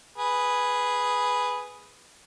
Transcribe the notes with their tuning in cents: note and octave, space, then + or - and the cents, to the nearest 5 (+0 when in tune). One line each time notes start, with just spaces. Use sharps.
G#4 +0 B4 +0